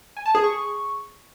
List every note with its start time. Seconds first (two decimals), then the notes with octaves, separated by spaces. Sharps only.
0.17 G#5
0.26 A5
0.35 G#4
0.44 C#6